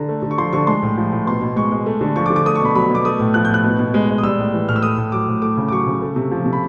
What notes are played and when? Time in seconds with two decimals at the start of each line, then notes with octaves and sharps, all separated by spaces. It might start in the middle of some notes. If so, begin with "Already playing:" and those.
Already playing: D3 A#5
0.09 A3
0.23 D3
0.31 C#6
0.38 F3 C6
0.53 D3 C#6
0.67 G#3 C6
0.82 A2
0.97 F3
1.12 A2
1.26 B2 C6
1.41 B2
1.56 G#3 C#6
1.72 G#3
1.86 A3
2.01 D3
2.16 F3 C#6
2.26 D6
2.30 D3
2.36 D6
2.46 A3 D#6
2.55 C#6
2.60 B2
2.65 B5
2.75 F#3 B5
2.90 B2 D6
3.05 A3 D#6
3.20 A2
3.34 F3 F#6
3.45 G6
3.49 A2 F#6
3.64 B2
3.79 B2
3.94 G#3
4.10 G#3
4.18 D#6
4.23 G3 E6
4.38 A2
4.54 E3
4.69 A2 F6
4.76 E6
4.83 A3 D#6
4.98 A2
5.12 F#3 D6
5.28 A2
5.42 A3 D6
5.57 C#3
5.68 D6
5.72 F#3 C#6
5.87 C#3
6.02 A3
6.16 C3
6.32 F3
6.46 C3
6.53 B5